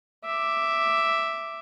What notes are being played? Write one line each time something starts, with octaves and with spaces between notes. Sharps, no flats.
E5 D6